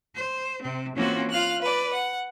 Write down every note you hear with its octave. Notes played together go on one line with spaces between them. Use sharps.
C5
C3 C4
E3 A#3 C4 C#4 F4 F#4
F4 F5 F6 F#6
B4 D5
F#5